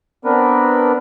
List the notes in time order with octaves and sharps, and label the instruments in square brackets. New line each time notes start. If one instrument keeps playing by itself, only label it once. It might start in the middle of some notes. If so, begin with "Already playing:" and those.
[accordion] B3 C4 D4 A#4 B4